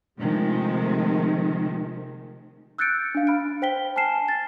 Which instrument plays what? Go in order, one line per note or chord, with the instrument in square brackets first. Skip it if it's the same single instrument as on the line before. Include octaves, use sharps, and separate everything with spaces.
[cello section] C3 D#3 F3 G#3 A3
[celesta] E6 F#6 G6 A6 C#7 D7
D4 F5
B5 F6 D7
C5 G5 B6 G7
G#5 A5 F6 C7 E7
A6